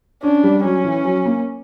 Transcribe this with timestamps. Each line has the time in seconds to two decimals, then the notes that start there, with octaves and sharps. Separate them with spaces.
0.23 C#4 D4
0.43 G3
0.64 F#3 C#4
0.84 E3
1.05 F#3
1.25 A#3